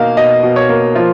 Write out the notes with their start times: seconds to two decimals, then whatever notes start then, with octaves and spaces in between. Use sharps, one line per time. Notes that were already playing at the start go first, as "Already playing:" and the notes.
Already playing: B2 A#3 D#4 F5
0.16 B2 D#5
0.43 B2
0.56 C#5
0.69 A#3
0.95 F3 F4